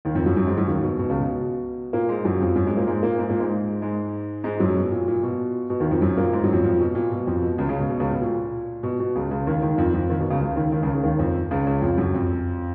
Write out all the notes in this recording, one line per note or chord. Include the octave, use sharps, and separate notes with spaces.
D#2 D#3
F2 F3
F#2 F#3
F#2 F#3
G#2 G#3
F#2 F#3
D#2 D#3
B2
B2
C#2 C#3
B2
A#2 A#3
G#2 G#3
F#2 F#3
F2 F3
F#2 F#3
G#2 G#3
A#2 A#3
G#2 G#3
A#2 A#3
G#2 G#3
A#2 A#3
G#2 G#3
G#2 G#3
G#2 G#3
F#2 F#3
B2
A#2
A#2
B2
B2
D#2 D#3
F2 F3
F#2 F#3
A#2 A#3
G#2 G#3
F#2 F#3
F2 F3
F2 F3
B2
A#2
B2
F2 F3
B2
C#2 C#3
C#2 C#3
B2
B2
C#2 C#3
B2
A#2
B2
B2
C#2 C#3
C#2 C#3
D#2 D#3
D#2 D#3
F2 F3
F2 F3
D#2 D#3
B2
C#2 C#3
C#2 C#3
D#2 D#3
D#2 D#3
C#2 C#3
C#2 C#3
D#2 D#3
F2 F3
C#2 C#3
C#2 C#3
F2 F3
F#2 F#3
F2 F3